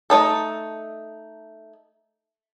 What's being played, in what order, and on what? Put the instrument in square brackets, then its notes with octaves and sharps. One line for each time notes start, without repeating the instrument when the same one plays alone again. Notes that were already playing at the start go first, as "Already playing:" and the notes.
[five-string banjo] A3 D#4 A4